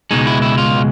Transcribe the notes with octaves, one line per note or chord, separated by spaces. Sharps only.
C#2 B2 G#3 D#4
E4
E4
F4